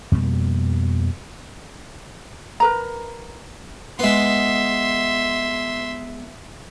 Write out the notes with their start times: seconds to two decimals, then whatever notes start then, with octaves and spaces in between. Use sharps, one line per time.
0.12 F2 B2 G3 A#3
2.60 A#4 B4 A#5
3.99 G#3 B3 E5 C6